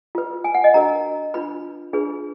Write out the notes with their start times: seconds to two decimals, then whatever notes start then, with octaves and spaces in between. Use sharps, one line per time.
0.15 F4 B4
0.44 G#5
0.54 F#5
0.64 D#5
0.74 D4 F#4 A#4 A#5
1.34 D4 F4 B4 B5
1.93 D4 F4 G#4 B4